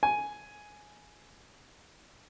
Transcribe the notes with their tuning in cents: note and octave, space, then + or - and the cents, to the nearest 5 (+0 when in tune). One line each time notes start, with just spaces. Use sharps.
G#5 +5